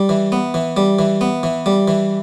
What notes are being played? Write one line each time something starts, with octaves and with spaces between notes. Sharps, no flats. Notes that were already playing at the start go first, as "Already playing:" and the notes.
Already playing: G3
E3
B3
E3
G3
E3
B3
E3
G3
E3